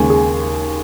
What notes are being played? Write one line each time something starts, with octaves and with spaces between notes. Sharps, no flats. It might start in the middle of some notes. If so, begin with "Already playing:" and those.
Already playing: D#2 C#3 G#3
G#4